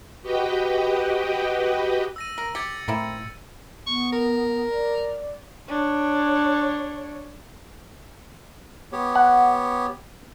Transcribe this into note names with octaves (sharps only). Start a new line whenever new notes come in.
F#4 G4 B4 D#5 G5
E6 A#6 D#7
A#4
G4 G#6 A6 C#7
A2 A#3 C4 E4
B3 C#6
A#4
D5
D4 C#5
B3 G4 C#5
F#5